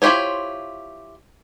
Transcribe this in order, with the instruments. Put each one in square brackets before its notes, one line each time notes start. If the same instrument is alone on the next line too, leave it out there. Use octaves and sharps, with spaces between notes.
[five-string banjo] E4 F4 G4 C5 C#5